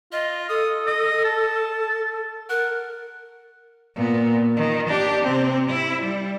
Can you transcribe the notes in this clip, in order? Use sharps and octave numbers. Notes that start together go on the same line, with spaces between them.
F4 D#5
A4 D#6
D#5
A5
A#4 F#5
A#2 B3
D#3
D4 G4
C3 C4
E4
G3